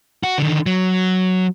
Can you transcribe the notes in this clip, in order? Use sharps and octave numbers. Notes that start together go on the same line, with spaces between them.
F#4
D3 D#3
F#3